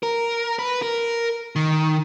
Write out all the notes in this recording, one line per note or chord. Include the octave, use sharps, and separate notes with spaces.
A#4
B4
A#4
D#3